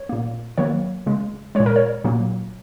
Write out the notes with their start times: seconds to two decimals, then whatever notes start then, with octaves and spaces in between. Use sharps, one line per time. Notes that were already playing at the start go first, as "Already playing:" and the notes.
Already playing: C#5
0.09 A#2 A#3
0.58 D#3 F#3 A#3 C#5
1.06 C#3 G#3
1.55 A#2 G#3 C#5
1.66 A#4
1.76 C#5
2.04 A#2 F#3 A#3